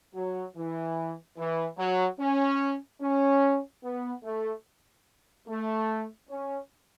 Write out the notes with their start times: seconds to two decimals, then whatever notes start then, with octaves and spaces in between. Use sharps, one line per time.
0.15 F#3
0.57 E3
1.38 E3
1.78 F#3
2.20 C#4
3.02 C#4
3.84 B3
4.24 A3
5.48 A3
6.29 C#4